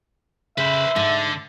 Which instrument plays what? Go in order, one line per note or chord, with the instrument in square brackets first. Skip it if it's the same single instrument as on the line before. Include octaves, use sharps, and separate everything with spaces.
[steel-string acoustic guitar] C#3 [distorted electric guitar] B4 C5 [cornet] E5
[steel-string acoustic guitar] G#2 [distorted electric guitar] D3